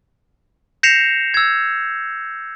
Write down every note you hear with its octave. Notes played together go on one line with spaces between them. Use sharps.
G6 A#6 C7 C#7 E7 F7
E6 G#6